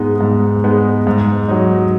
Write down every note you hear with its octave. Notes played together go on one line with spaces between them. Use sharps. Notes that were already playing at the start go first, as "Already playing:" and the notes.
Already playing: G#2 G#3 B3 D#4
G#2
G#3 B3 D#4
G#2
F#3 D#4